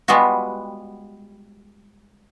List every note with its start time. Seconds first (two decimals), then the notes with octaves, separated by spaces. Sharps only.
0.08 G3 G#3 B3 F4 F#4